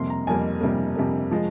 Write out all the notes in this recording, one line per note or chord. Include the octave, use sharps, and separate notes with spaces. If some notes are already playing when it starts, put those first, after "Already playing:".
Already playing: F2 C3 G3 A#3 C6
A#5
F2 C3 G3 A#3 G#5
F2 C3 G3 A#3
F2 C3 G3 A#3
F3 G#3